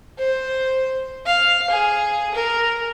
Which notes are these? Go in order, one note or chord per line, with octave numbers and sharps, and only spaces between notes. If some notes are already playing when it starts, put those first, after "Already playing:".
C5
F5
G#4
A#4